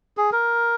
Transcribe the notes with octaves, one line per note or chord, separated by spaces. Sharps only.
G#4
A#4